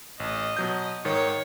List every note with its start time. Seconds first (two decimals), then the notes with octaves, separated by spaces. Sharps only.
0.20 A1 D#5
0.57 B2 F#3 G6
1.05 G#2 D#3 C#5